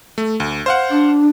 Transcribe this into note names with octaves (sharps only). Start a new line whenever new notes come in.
A3
D2
C5 F5 F#5
D4